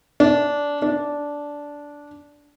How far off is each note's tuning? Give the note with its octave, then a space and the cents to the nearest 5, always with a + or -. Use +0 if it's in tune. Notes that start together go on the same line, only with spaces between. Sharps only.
D4 -15
D4 -10